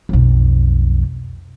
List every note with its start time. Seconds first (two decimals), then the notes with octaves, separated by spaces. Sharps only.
0.09 B1 F2